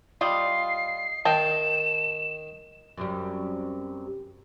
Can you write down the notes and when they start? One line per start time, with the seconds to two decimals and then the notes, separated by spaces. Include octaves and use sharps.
0.21 G3 F4 D#5 C7
1.25 D#3 D#5 G5 A5 E7
2.98 F#2 C3 G3